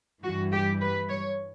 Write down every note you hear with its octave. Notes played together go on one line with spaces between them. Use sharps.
G2 E3 G3 F#4
G4
B4
C#5